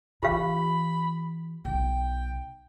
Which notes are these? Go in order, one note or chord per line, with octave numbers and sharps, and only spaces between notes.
E3 F4 G4 F5 B5
B1 G5